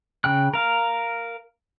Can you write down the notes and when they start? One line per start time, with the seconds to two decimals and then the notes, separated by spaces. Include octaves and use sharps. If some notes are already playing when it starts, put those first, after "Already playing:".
0.24 C#3 G5 F#6
0.54 A#4 F5